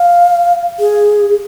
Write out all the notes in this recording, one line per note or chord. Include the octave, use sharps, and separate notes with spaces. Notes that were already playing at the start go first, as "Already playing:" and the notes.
Already playing: F5
G#4